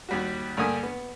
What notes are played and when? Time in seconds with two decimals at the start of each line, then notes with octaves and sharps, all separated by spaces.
0.09 D#2 G3 F#4
0.57 G2 D3 G3 A#3 G#5 D#6
0.83 B3